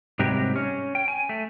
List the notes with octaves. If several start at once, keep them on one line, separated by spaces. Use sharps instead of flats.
G#2 C3 F#3 G3 G4 A#4
C#4
G5
G#5
A3